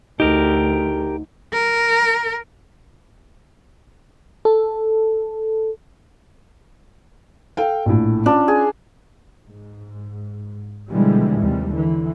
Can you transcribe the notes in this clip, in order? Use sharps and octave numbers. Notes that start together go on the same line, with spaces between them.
D2 D#4 G4 A#4
A#4
A4
A4 F5 G5
A#1 A2
C#4 D4 F4
G#4
G#2
B2 D3 E3 F3 G3 G#3
D#2 C3 G3
D3 E3